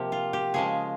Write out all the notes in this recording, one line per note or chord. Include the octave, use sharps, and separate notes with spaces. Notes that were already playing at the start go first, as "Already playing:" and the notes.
Already playing: C3 F3 A#3 G4
F4
G4
C#3 F3 G#3 G#4